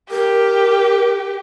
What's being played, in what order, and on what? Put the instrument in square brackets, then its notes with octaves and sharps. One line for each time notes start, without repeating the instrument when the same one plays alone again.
[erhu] G4 [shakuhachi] A#4